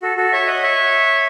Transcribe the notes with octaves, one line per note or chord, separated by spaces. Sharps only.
F#4 A4
F#4 A4
C#5 E5
D#5 F#5
C#5 E5